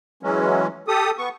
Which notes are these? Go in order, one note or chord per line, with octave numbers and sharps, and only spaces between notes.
E3 F#3 G#3 C#4
G4 A4 D#6
B3 C#6